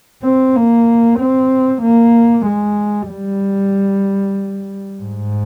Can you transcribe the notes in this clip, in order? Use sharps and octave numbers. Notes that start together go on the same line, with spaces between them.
C4
A#3
C4
A#3
G#3
G3
G#2